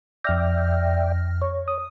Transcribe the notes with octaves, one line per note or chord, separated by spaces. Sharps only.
F2 D5 E5 G5 F6 A#6
C#5
D#6